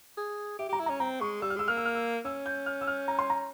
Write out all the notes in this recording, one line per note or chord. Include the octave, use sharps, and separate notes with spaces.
G#4
G4 E5
G4 A#5
E4
A#5
C#4
C4 A#5
G#3 C#6
G3 E6
F6
G#3 E6
A#3 F6
E6
F6
E6
C#4 E6
G6
F6
E6
F6
A#5
C6
A#5